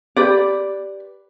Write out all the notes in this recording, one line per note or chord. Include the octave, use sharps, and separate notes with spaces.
G4 B4 D5